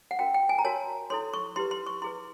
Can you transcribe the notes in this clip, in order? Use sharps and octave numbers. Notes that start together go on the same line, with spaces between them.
F#5
C#4 F#4 A#4 G5
G5
G#5
A#5
F#4 A#4 C#5 A5
E4 A4 C#5 C6
C#6
E4 G4 B4 C6
C6
C#6
E4 G#4 B4 C6